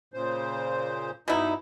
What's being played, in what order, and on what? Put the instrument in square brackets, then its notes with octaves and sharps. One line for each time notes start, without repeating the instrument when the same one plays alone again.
[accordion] A#2 C#3 C5
[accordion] G2 D#4 [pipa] B2 E4